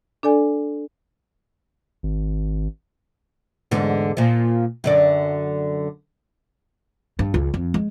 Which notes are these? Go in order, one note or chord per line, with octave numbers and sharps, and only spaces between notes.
D4 A4 D5 G#5
G#1
E2 G#2 D3
A#2 F3
F#2 D3 D5
G2
C#2
F2
G#3